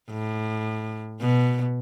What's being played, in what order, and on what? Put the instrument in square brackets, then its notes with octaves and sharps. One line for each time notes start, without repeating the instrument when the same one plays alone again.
[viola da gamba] A2
B2